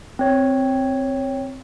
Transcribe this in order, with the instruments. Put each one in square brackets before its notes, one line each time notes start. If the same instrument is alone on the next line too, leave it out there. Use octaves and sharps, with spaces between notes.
[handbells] C4 C#5